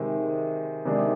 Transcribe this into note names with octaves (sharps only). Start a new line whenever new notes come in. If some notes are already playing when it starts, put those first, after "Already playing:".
Already playing: C3 D#3 G#3
C3 D#3 G#3 D4